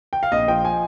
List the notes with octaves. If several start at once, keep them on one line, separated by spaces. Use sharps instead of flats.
G5
F5
A#1 D#5
F3 G5
G#5